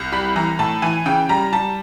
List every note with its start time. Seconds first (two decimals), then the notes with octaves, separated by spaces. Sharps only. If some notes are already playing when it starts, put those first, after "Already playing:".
Already playing: C2
0.12 G3 B5
0.36 E3 A#5
0.59 A2 A5
0.82 E3 G#5
1.06 C#3 G5
1.29 G3 A#5
1.53 G3 A5